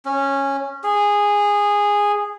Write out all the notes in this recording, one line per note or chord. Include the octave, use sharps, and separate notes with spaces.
C#4
G#4